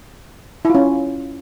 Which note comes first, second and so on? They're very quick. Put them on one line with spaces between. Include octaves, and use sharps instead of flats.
E4 F4 C#4